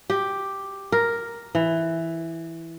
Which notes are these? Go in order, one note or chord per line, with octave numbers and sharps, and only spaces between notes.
G4
A#4
E3